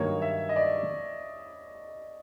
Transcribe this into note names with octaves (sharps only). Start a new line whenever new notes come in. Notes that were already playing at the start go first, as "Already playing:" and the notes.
Already playing: G2 D#3 F#3 A#3 C#5
E5
D#5
D5